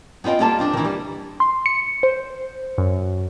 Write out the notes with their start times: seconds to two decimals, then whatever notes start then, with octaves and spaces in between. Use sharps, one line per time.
0.24 B3 C4 F4 D#5 G5
0.40 G3 A#3 F4 A4 A5
0.59 F3 C4 D4
0.73 D#3 E3
0.85 G3
1.40 C6
1.66 C#7
2.03 C5
2.78 F#2